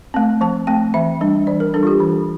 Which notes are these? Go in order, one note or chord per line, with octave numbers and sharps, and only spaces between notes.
A3 C4
F3 A5
A3 C4 G5
E3 E5
G3 D4
E3 D5
A#4
G3 D4 A4
F4
G4
E3